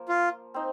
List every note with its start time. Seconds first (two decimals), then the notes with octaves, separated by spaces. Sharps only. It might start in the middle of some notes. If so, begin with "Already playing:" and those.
Already playing: F3 A#3
0.09 F4
0.54 C4 D#4